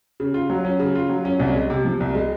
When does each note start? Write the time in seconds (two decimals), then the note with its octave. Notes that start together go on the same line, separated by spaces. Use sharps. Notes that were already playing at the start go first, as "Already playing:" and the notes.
0.20 C#3
0.34 F4
0.50 F#3
0.65 C#4
0.80 C#3
0.95 F4
1.09 F#3
1.25 C#4
1.40 C2
1.55 G#3
1.70 C3
1.85 F3
2.00 C2
2.15 G#3